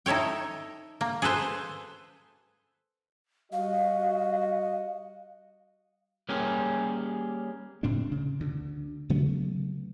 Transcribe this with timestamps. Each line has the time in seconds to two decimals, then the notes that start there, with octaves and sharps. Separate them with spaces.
0.06 D#4 E4 A4 C#5 G5
1.01 A#3
1.22 G#4 A4 B4 C5
3.53 G3 F#4 D#5 F5
6.29 G3 A#3 C#4 G4 G#4 A#4
7.83 F#1 A2 C4 D4
8.12 C#3
8.40 D2 D3
9.10 C#3 F#3 A3 B3